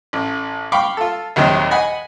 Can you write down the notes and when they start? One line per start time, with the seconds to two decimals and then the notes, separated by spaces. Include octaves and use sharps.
0.13 A1
0.72 F5 G5 B5 C#6 D6
0.97 F4 A4
1.36 A#1 D#2 C3 D#3 F#3
1.71 D#5 F#5 G#5 B5